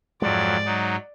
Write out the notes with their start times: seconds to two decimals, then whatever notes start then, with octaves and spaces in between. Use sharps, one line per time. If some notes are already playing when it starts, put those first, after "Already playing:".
0.22 F2 G#2 F#3 G#3 D5
0.65 F#3 D#4